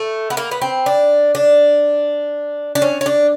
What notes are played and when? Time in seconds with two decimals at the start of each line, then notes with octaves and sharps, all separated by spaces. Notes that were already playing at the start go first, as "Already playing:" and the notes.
Already playing: A3
0.30 B3
0.37 A#3
0.51 B3
0.62 C4
0.86 D4
1.35 D4
2.75 D4
2.82 C#4
3.01 C#4
3.06 D4